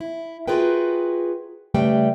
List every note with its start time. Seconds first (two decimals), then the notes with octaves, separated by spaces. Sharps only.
0.01 E4
0.48 F4 F#4 G#4 A#4 B4 G5
1.74 C#3 G3 A3 B4 G5